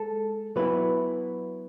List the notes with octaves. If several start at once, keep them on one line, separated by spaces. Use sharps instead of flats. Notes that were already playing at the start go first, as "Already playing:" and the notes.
Already playing: G#3 A4
F#3 B3 E4 B4